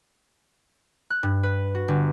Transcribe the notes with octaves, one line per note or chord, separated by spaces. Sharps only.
F#6
G2
B4
F#4
G1